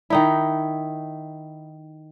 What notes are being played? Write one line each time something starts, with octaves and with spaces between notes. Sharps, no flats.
D#3 D#4 E4